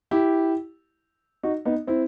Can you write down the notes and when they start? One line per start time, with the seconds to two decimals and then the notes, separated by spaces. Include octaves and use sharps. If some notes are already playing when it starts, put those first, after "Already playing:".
0.11 E4 G4
1.43 D#4 F#4
1.65 B3 D#4
1.87 C4 E4